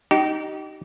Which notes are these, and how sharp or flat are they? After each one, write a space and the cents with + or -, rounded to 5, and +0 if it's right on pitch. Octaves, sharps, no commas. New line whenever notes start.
D#4 +0 G4 -35